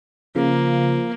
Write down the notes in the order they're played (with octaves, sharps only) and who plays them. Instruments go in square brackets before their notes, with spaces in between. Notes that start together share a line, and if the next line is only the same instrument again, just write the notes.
[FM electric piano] C#3 [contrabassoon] F3 [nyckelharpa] A#3